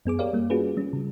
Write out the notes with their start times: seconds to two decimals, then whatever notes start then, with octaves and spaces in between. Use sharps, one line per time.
0.05 F#2 B3 G#4 D6
0.19 G4 A#4 C#5 D5 F5
0.33 G3 A#3
0.50 C#4 F4 F#4 G#4 B4
0.77 G3 C#4
0.93 C#3